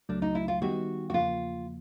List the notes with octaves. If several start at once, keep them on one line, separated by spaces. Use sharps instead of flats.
C#2 C#3 F#3 A3 D4
D#4
E4
F4
D#3 G3 B3 D#4 F#4 G4
F#4
E2 C#3 F3 A#3 F4